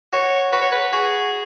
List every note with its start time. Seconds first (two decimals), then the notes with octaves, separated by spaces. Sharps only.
0.13 F#4 C#5
0.52 F#4 B4
0.62 C#5
0.72 B4
0.92 F#4 G#4